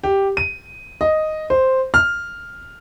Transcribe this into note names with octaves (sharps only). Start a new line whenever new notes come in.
G4
D#7
D#5
C5
F6